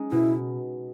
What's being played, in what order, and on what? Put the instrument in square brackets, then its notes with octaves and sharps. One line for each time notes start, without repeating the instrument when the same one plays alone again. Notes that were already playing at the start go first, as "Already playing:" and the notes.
Already playing: [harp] G#3 C#4 D#4
[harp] B2 [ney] E4